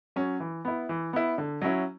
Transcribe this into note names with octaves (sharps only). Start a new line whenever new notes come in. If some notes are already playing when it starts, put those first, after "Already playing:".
F#3 C#4
E3
B3 E4
E3
B3 E4
D3
F#3 C#4 E4